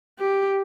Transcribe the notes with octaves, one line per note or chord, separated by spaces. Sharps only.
G4